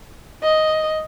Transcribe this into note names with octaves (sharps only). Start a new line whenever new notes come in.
D#5